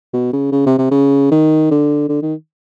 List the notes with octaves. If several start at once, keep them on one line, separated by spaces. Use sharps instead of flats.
B2
C#3
C#3
C3
C3
C#3
D#3
D3
D3
D#3